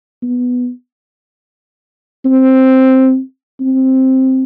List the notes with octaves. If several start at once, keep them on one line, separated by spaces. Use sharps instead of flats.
B3
C4
C4